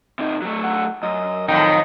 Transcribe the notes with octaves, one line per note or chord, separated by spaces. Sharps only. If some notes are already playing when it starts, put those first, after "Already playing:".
C3 D#4
F#3 A3
F#5
F#2 D#5
F2 A2 D#3 D#4 G5